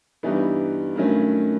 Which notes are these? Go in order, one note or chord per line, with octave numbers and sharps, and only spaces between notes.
G2 E3 G3 B3 D#4
G2 D#3 F#3 A3 C#4